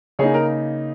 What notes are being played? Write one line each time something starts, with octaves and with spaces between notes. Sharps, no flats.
C#3 A#3 D#4 G#4 C#5
A#4